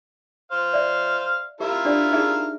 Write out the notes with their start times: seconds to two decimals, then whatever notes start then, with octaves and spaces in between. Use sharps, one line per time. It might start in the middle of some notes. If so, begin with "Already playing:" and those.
0.52 C5 F5
0.74 D5 E5
1.60 E4 F4 G4 A#4
1.85 D4 G4 D5
2.13 D#4 G#4 E5